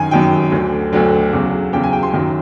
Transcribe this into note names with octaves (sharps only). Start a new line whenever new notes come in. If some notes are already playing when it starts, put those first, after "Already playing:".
Already playing: F#2 D#3 F#3 G#5
F#2 D#3 F#3 G5
D2 D3 F#3
D2 D3 F#3
E2 C#3 F#3
E2 C#3 F#3 G5
G#5
G5
C6
F#2 D#3 F#3